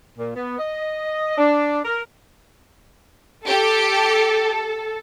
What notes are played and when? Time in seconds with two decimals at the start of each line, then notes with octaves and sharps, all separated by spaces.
0.18 A#2
0.36 B3
0.59 D#5
1.38 D4
1.85 A#4
3.47 G4 A4